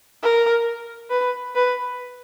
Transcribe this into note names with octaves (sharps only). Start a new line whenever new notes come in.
A#4
B4
B4